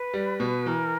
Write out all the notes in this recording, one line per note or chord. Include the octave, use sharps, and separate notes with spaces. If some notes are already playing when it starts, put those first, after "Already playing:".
Already playing: B4
G3
B2
E3 A#4